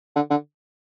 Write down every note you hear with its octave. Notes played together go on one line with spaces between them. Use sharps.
D3
D3